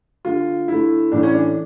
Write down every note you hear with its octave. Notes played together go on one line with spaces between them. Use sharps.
D3 A3 F4
D3 A3 E4
A2 E3 A3 D4
C#4
D4